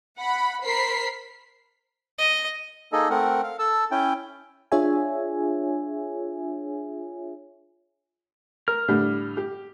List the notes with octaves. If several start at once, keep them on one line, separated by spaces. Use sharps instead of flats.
F#5 B5
A#4 C5 B5 B6 C7
D#5
A#3 D#4 G#4 A4 D#5
A3 C4 A#4 F#5
F5
A4 A5 E6
C#4 E4 G5
D4 F4 G#4 C#5 E5 G#5
A#4 F6
A2 D3 G3
G4